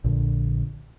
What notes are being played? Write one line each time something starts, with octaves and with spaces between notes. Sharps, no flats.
A#1 A#2 D3